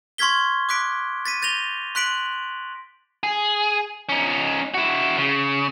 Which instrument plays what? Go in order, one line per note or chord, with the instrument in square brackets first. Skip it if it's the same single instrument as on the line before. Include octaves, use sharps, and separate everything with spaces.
[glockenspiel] C6 C#6 F6 G#6 B6 G7
D6 F#6 B6 D7
A6 B6 D#7
G6 A6 A#6 F7 G7
C6 F#6 B6 D7 F#7
[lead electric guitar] G#4
C#4 D#4
E4 F#4
C#3